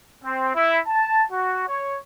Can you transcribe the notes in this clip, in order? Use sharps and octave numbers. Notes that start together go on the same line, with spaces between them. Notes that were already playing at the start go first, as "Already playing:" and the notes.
C4
E4
A5
F#4
C#5